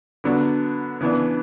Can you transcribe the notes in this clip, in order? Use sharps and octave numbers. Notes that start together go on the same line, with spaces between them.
D3 F#3 B3 D4
C#3 E3 B3 D4